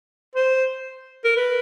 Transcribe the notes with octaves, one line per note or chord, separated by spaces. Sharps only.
C5
A#4
B4